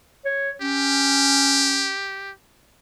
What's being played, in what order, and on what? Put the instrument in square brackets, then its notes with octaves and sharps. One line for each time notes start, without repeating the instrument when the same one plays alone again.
[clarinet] C#5
[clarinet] C#4 [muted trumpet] G4